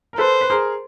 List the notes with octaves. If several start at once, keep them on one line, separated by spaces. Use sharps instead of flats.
A#4
A4 B4 C5
B4
G#4 A#4